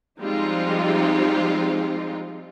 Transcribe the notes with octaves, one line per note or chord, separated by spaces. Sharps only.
F3 G3 G#3 C4 D#4 F4